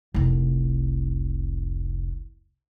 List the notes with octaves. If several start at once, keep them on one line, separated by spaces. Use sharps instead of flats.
F1 C2